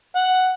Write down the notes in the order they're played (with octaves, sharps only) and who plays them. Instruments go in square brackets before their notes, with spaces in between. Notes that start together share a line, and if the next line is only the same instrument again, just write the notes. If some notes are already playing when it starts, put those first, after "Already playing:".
[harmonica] F#5